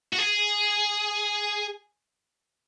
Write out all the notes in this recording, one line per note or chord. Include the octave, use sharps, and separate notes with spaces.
F#4
G#4